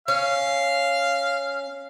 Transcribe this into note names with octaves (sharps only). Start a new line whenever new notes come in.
C#4 F5